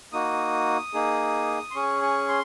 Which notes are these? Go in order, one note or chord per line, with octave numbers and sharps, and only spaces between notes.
A#3 D#4 F#4 D#6
A#3 D#4 G#4
C6
C#4 G#4 C#6
C#6
C6